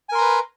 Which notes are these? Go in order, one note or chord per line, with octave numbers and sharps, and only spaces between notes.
A#4 B4 G#5 A#5 C6